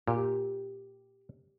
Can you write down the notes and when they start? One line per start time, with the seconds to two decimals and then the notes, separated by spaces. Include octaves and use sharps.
0.08 A#2 G4